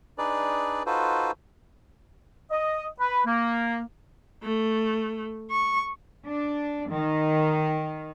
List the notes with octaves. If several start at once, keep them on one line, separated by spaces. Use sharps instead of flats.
D4 D#4 G#4 B4 D5
D#4 F4 F#4 A4 B4 C5
D#5
B4
A#3
A3
C#6
D4
D#3